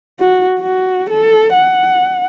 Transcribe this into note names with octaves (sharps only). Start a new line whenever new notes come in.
F#4
F#4
A4
F#5